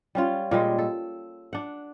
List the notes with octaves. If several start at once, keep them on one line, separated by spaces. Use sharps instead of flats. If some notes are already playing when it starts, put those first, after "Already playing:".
G3 C#4 F4
A#2 G3 G#3
A4
D4 F#5